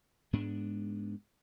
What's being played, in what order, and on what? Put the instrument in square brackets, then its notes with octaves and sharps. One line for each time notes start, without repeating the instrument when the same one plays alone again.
[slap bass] G#2 G#3 B3 D4